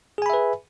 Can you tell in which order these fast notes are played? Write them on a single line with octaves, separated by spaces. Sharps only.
G#4 G#5 B5 E5 B4